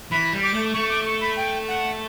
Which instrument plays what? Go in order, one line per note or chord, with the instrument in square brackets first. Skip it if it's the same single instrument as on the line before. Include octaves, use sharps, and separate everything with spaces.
[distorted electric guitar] E3 [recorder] B5
[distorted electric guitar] G3
[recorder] D6
[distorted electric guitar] A3
[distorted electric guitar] A3 [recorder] C#6
[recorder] D6
C#6
B5
G5
F#5